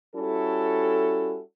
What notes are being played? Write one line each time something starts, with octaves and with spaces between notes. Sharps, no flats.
G3 C#4 E4 F#4 A4